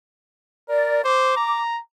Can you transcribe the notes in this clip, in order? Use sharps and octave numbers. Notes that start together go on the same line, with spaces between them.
A#4 D5
C5 D6
A#5